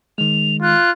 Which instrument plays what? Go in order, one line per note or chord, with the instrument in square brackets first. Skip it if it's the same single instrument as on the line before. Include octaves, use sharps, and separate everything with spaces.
[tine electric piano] D#3 G#3 [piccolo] F7
[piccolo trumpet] F4 [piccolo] F#6